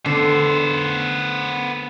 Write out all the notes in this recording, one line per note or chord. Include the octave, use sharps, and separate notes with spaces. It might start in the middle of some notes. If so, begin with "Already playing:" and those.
D3 B3 C5